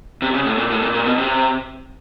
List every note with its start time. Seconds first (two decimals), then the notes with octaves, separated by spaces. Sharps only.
0.22 C3
0.34 C#3
0.46 A2
0.58 A#2
0.70 A2
0.82 A#2
0.94 A#2
1.06 B2
1.18 C3